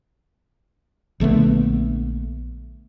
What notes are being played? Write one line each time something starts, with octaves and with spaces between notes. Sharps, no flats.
A#1 D3 A3 B3